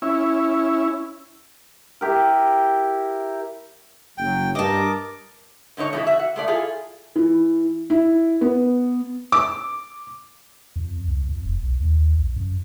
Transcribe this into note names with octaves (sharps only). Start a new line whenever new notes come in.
C#4 E4
E4 G4 A#4
F#1 F#3 G5
G2 A#4 D#5 A5 D6
G#2 D3 D#4 C#5
F2 B2 F#3 G#3 B3 E4
F#4 E5
F#5
G#3 A3 D5
E4 F4 G#4 A4
E3
E4
B3
D6
F2
C#2
F2
E1
B1
D#2
A#1
F#2